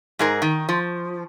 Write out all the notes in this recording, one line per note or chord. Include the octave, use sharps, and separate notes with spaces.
G#2 G#4 A#4
D#3
F3